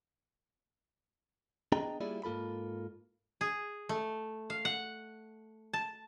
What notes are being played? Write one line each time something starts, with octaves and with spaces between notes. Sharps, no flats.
B3 D4 G#4 D#5 G5 A#5
G3 A#3 E4 F4 G#4 D5
G#2 A#3 F4 A4 B5
G#4
A3
F5
F#5
A5